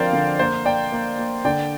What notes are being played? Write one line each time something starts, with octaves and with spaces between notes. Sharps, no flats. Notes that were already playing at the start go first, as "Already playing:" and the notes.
Already playing: D3 F3 C4 A#4 C5 D5 F5 G5
D3
A#3 C5
A#3 D5 G5
A#3
A#3
D3 D5 G5